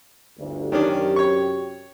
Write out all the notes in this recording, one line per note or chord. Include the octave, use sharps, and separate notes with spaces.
G1 D2
F#2 C3 D#3 C#4 D4 G4
C#5 C#6